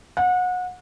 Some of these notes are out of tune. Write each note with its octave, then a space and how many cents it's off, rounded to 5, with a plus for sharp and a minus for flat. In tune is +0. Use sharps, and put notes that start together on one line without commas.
F#5 -30